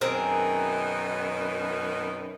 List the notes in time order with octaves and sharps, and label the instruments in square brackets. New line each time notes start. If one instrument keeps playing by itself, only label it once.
[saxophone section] F#2 B2 D#3 [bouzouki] C4 G#4 A#4